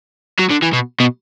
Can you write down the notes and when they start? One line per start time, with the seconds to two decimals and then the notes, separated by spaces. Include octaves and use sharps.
0.40 F#3
0.51 D3
0.63 E3
0.73 B2
1.00 B2